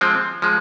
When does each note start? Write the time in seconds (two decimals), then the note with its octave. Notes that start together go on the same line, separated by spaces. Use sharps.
0.01 F3 G#3 C4
0.42 F3 G#3